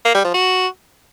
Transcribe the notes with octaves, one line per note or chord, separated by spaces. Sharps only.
A#3
G3
F3
F#4